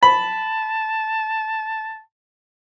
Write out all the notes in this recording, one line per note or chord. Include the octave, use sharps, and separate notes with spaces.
A5 B5